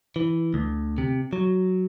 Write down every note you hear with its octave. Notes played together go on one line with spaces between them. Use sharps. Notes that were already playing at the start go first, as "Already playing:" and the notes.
E3
D2
C3
F#3